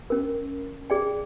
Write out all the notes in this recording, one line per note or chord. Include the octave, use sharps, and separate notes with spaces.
C#4 A#4
G#4 D5 G5